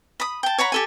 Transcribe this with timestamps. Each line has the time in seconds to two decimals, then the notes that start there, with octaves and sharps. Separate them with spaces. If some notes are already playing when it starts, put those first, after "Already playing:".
0.20 B5 D#6
0.43 G5 A5
0.58 C#5 F#5 A#5 B5
0.72 G4 A4 G#5